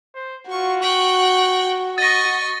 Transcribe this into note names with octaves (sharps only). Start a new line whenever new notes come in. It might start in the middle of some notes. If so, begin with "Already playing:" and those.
C5
F4 F#4 C#6
G5 C#6 F#6
D#5 C#6 D#6 A6 A#6